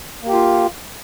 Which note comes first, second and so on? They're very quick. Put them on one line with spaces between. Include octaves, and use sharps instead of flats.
A#3 G4 F4